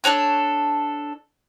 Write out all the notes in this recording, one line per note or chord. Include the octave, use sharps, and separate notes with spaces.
D4 A4 C#5 F#6